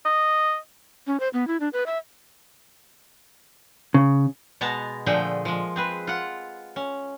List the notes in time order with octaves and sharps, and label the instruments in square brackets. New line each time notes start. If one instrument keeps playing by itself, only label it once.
[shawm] D#5
[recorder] C#4
C5
B3
E4
D4
B4
E5
[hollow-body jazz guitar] C#3
[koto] B2 G#3 B3 A5 A#5
A#2 D3 F3 A3 G#4 G5
F3 G#3
C4 G#4 B4
F4 F#5
C#4